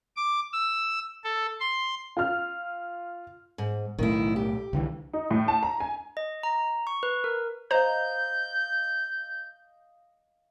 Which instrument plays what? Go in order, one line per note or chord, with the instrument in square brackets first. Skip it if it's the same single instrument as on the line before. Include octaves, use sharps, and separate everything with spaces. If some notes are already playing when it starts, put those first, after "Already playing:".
[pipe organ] D6
E6
A4
C6
[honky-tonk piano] F4 F6
[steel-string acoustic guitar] G#2
[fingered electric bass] B1 A2 A3 [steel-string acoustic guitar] D#3 E4
[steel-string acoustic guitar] G4
[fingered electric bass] C2 D3 E3
[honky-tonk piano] D#4
A2
A5
A#5
G#5
[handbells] D#5
A#5
C#6
B4
A#4
[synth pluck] C5 A#5 [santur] D#5 F5 [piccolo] G6